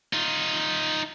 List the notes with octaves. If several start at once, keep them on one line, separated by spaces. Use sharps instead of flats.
D#4 F4